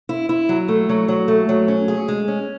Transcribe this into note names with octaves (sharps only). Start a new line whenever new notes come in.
E4
E4
F#3
A3
F#3
F#3
A3
F#3
C#4
G#4
G#3
C#4